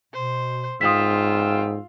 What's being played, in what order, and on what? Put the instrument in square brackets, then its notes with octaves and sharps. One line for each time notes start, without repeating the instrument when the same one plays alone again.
[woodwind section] B2 [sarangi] C5
[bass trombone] G#2 [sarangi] F4 [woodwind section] F5 G5 E6 [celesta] D#6 B6